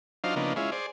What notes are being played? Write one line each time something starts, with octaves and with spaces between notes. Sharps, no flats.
F#3 D4 D#4 F4 C5 F5
C#3 F3 A#3 B3 D4 D#4
G#3 C#4 E4 F4
G#4 C5 D5